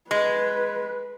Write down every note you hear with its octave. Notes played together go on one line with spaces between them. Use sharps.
G#3 B4